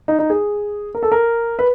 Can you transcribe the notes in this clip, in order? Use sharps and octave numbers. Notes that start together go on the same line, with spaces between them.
D#4
D#4
G#4
A#4
A4
A#4
B4